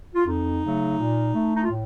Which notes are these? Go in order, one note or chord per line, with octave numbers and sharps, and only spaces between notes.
F4
F2 D#4
C#3 F#3 A3
A#2
A3
D#4
F4
A2